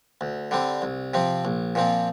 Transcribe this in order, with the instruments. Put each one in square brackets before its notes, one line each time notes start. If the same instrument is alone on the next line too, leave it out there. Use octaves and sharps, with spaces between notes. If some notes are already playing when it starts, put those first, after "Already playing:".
[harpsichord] D2
D3 G3 C4
C2
C3 F3 C4
A#1
A#2 F3 C4